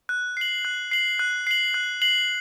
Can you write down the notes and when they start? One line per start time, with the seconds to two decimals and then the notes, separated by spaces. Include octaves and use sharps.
0.09 F#6
0.37 C7 F#7
0.65 F#6
0.91 C7 F#7
1.19 F#6
1.47 C7 F#7
1.74 F#6
2.02 C7 F#7